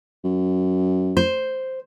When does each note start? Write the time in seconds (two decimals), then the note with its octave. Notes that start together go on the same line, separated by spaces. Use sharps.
0.24 F#2
1.17 C5